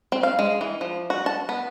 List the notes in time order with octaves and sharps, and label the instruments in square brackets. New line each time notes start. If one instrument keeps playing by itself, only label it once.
[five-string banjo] C4
F5
G#3
E3
F3
F#4
A5
B3